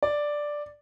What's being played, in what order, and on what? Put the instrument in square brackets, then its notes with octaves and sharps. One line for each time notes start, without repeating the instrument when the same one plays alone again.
[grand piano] D5